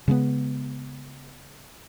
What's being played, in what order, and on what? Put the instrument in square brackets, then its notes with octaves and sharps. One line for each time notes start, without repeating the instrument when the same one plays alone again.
[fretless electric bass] C#3 G#3 A#3 B3